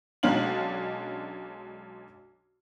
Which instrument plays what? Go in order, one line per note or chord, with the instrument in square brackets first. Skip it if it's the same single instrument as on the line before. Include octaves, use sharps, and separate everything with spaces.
[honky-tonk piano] B1 G#3 C#4 D4 F5 F#7